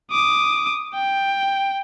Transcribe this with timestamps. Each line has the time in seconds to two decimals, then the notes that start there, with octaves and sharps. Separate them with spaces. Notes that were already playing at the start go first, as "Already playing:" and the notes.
0.11 D6 D#6
0.94 G5